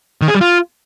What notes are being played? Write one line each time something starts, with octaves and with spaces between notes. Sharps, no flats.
D#3
G#4
G3
F4